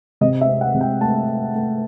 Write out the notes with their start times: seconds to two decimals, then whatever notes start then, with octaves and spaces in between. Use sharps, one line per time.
0.21 C3 D#5
0.41 E5
0.48 C4
0.61 F#5
0.74 C3
0.81 G5
1.01 A3 A5
1.27 A3
1.55 A3